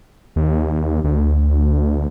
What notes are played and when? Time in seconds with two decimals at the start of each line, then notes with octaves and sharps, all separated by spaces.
0.36 D#2
1.04 D2